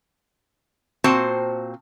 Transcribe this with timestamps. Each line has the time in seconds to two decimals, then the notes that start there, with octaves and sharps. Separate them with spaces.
1.04 A#2 C4 F#4 C5 A5